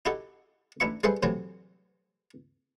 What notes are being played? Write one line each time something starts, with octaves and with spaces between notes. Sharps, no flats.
D#4 E4 F#4 G4 A4
A1 D4 E4 E5 C#6
G3 G#4 A4 B4 C5 E5
A2 C3 E3 F#3